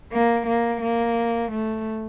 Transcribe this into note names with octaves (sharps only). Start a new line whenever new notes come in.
A#3
A#3
A#3
A3